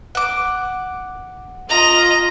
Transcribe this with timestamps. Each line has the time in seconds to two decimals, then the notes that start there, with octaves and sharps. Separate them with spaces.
0.15 F#5 D6
1.69 F4 D#5 A#5